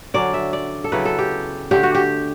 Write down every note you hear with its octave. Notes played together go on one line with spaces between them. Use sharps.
D3 F#3 C#4 D5
E5
D5
A4
C#3 F#3 B3 E4 B4
A4
G4
D3 A3 D4 G4
F#4
G4